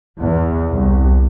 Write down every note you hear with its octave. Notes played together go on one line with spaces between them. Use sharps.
E2
C2